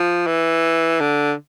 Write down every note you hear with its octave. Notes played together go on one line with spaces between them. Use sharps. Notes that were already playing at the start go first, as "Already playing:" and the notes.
Already playing: F3
E3
D3